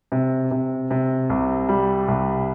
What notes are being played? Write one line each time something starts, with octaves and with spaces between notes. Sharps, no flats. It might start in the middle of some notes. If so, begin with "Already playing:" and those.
C3
C3
C3
C2
G3
C2